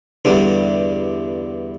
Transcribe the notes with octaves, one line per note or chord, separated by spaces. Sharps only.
E2 G2 D3 G3